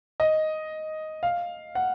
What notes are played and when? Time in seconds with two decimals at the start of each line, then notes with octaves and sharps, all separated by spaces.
0.20 D#5
1.23 F5
1.75 F#5